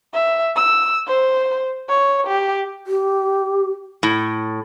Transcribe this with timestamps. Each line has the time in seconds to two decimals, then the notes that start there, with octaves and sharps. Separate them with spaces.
0.14 E5
0.56 E6
1.08 C5
1.89 C#5
2.27 G4
2.87 G4
4.03 A2